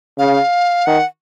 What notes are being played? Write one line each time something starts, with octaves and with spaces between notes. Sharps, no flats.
C#3 F5
D#3 F#5